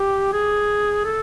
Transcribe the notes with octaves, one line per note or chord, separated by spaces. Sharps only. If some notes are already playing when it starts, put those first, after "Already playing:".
Already playing: G4
G#4
A4